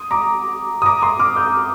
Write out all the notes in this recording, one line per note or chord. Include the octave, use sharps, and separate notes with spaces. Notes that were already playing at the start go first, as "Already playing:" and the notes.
Already playing: C6 D#6
A#5 D6
D#6
A#5 D6
C6 D#6
D6 F6
D#6 G6